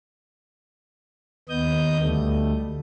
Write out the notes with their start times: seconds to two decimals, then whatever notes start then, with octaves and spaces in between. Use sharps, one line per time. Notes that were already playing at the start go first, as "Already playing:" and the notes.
1.49 D#2 B3 D#5 D#6 G6
2.02 D2 D3 G3 A3